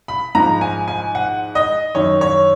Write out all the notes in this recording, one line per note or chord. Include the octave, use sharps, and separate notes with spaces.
B5
G#2 F3 A#5
G#5
G#5
F#5
D#5
F#2 D#3 C#5
C#5